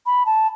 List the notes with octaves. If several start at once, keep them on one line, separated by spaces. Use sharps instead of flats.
B5
A5